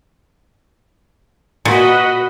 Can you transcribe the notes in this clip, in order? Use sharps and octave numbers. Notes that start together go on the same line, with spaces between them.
A#2 F#4 B4 D#5